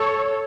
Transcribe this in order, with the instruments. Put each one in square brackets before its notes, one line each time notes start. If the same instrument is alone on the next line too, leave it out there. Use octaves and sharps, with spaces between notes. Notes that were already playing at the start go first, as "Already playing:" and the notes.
Already playing: [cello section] A4 C#5